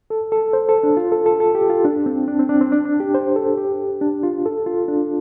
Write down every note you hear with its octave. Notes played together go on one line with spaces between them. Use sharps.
A4
A4
C5
A4
D4
F4
A4
A4
A4
G4
F4
D4
C4
D4
C4
D4
C4
D4
D4
G4
C5
A4
G4
D4
F4
A4
F4
D4